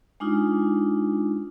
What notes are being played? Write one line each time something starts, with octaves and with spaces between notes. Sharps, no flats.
G#3 D4 D#4 F4